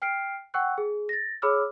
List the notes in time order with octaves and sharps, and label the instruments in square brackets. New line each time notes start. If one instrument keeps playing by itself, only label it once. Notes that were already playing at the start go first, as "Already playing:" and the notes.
[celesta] G5 F6 C7 D7
F#5 G5 C#6 E6 F#6
G#4
A6 A#6
G#4 C#5 B5 D6 E6 F6